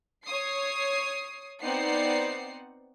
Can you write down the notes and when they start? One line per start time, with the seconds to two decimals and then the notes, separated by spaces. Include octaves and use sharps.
0.25 C#5 D#6 C7
1.63 B3 C4 D#4 D5 F#5 C7